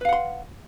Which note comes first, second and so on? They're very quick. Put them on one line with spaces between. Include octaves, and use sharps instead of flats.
B4 F5 F#5 C6